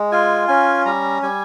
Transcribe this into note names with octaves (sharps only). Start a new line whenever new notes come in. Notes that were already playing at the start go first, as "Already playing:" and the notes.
Already playing: G#3
F4 G#5
C#4 G#5
G3 A#5
G3 G#5